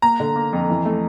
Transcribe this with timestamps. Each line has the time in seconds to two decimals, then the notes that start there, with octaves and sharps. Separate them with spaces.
0.02 A#3 A#5
0.20 D3
0.36 A#3
0.53 F2
0.70 E3
0.85 A3